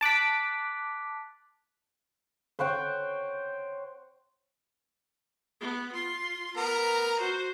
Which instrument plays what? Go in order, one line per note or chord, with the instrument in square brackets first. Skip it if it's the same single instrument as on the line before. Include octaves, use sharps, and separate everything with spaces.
[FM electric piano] A5 D6 F#6 B6
[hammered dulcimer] C5 C#5 F#5 G5
[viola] B3
F4 C6
[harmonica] B3 A#4 [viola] A#5
[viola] F#4 C5